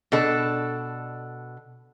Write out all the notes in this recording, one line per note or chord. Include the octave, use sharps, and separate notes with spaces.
B2 D4 A4